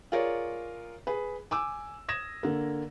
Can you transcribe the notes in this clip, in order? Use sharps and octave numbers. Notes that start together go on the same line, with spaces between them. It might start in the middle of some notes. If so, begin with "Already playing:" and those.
F4 G#4 A#4 C#5 D5
G#4 B4
G#5 D6 E6
D#6 G#6 A#6 E7
D3 A#3